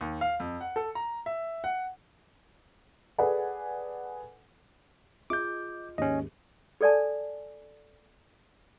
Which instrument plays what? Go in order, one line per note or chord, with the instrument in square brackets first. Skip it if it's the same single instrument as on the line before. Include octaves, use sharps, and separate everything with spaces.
[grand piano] D#2
F5
F2
F#5
A4
A#5
E5
F#5
[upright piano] G#4 A4 B4 D5 F#5 G#5
[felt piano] F4 G#4 D#5 [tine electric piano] D6 G6
[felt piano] D#2 G#2 G#3 [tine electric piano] C#4 D#5
[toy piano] G#4 A4 D5 G#5 A5